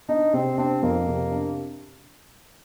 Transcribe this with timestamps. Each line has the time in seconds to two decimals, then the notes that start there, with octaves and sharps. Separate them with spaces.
0.09 D4 D#4
0.33 C3 C4
0.58 C4 D4
0.83 F2 A#3
1.07 C3
1.31 D4